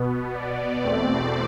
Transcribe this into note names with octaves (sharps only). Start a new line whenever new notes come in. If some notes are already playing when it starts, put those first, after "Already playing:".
Already playing: B2 B3
D5
E2 B2 A3 C4 D5